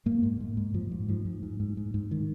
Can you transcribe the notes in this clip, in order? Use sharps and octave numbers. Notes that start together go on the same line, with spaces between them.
G#2 A#3
G#2
G#2
G#2
G#2 F3
G#2
G#2 F3
G#2
G#2
G#2
G#2
G#2
D#3